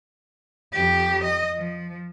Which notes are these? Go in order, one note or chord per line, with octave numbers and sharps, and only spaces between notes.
F2 G4
D#5
F3